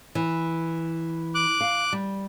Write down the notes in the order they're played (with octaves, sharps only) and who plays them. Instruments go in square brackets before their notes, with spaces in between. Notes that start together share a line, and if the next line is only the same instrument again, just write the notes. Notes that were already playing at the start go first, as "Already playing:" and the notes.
[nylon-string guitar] E3
[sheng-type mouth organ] D6 F#6
[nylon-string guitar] F5
G3